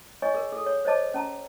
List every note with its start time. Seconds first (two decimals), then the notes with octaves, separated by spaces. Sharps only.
0.22 C#5 D#5 G#5 C#6
0.34 G#4 A#4
0.52 G#4 A4
0.66 C#5
0.85 C5 C#5 D#5 A5 D6
1.14 C#4 A5 A#5